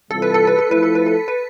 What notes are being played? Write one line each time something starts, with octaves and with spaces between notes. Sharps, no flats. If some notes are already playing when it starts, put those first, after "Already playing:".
C3 E3 G3 C4 F4 A4
B4
A4
B4
A4
F3 A3 E4 B4
A4
B4
A4
B4